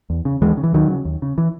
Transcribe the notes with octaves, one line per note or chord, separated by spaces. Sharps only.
E2
C#3
D#2 E3 G#3
C#3
E3
D#2 D#3 F#3
C#3
D#2
C#3
E3